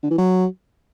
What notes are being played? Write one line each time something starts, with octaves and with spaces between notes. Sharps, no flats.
D3
E3
F#3